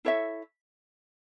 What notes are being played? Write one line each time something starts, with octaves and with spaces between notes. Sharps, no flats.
E4 A4 C#5 E5